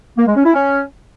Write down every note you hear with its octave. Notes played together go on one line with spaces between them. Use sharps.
A#3
G#3
C#4
E4
C#4